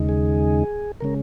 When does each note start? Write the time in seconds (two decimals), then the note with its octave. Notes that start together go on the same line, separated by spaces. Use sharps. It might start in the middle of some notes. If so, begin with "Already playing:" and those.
Already playing: D#2 C#3 G#3 D#4
0.09 G#4
1.00 C#3 G#3 C#4 A#4